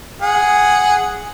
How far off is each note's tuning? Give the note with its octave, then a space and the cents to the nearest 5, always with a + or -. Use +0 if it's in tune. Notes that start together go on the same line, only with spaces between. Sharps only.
G#4 +0 F#5 +0